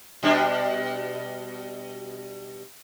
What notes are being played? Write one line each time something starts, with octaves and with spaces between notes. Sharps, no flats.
B2 G3 D4